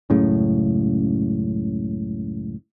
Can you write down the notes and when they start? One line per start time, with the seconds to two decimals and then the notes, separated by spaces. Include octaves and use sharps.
0.10 C#2 F#2 A2 C#3